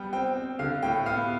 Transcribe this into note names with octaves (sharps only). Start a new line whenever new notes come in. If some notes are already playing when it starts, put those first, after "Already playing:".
Already playing: G3 B3 G5
C4 G5
C4
D3 F5
A2 G5
B3 F5